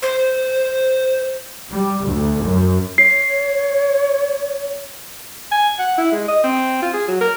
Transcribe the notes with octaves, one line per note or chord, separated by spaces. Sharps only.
C5
G3
D2
F#2
C#5 C7
G#5
F#5
E4
G#3
D#5
C4
F4
G#4
F#3
A#4